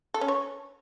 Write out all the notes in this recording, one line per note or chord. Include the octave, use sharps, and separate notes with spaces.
A4
C#4
C#5